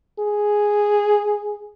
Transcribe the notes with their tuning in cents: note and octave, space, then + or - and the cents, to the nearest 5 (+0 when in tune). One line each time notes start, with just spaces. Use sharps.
G#4 +0